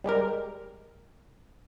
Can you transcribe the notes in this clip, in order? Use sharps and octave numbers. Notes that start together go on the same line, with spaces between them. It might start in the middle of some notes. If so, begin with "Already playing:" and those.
G3 G#3 G4 A#4